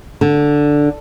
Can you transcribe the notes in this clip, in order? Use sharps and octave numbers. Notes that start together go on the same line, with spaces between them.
D3